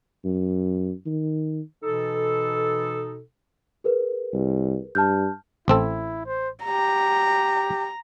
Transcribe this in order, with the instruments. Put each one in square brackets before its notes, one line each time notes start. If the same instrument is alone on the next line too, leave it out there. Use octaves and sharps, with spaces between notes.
[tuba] F#2
D#3
[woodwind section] B2 E3 D#4 A4
[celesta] G#4 A#4 B4
[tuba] C2
[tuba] G2 [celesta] A5 F6 G6
[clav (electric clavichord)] A1 C4 A4 [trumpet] E4
[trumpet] C5
[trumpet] G4 [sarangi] A#5